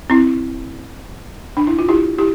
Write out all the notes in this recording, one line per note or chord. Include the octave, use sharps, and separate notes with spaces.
C4 E4
D4
E4
F4
E4 G4
E4 G4